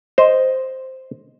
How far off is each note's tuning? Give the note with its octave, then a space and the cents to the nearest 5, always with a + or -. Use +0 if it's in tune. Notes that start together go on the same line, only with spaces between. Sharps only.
C5 +0 D#5 +0